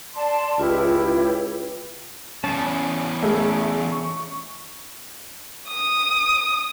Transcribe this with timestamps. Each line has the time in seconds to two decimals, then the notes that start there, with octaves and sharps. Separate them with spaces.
0.15 D5 A5 C6
0.59 C#2 E4 F4 G4 B4
2.44 E2 C#3 C#4 A5
3.23 A3 G#4
3.92 C#6
5.69 D#6